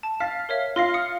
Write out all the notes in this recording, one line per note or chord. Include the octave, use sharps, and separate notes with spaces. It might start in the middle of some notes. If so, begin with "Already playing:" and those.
A5
F5 A6 B6
A#4 C#5 E5
F4 F5 C6 A#6 C7
D#6 C#7